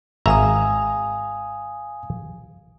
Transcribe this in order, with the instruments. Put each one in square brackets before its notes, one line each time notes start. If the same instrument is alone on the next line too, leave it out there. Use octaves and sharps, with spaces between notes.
[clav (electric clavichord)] G#1 E5 A#5 [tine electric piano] F5 G#5 D#6